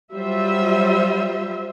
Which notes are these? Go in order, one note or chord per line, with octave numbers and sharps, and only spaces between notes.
F#3 G3 F4 C5 E5